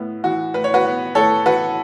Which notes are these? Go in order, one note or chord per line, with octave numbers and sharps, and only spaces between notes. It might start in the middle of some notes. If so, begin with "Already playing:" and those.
Already playing: A2 B3
E3 F#4
A2 B4
C#5
F#4 B4
B3
A2 A4 C#5
E3 F#4 B4